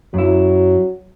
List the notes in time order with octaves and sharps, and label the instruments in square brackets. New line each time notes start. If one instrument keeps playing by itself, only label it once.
[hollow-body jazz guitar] F#2 E4 [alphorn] F#3